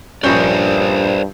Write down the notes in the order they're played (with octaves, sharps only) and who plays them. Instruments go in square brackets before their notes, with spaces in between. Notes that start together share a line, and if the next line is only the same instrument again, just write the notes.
[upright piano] A#1 G6 [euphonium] G2 [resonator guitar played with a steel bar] C#4 [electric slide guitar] A#4 C5 D5